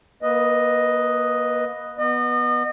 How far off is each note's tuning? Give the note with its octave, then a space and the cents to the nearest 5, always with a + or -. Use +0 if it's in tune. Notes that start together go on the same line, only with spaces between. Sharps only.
A#3 +30 B4 +0 D#5 +0
B3 -10 D#5 -35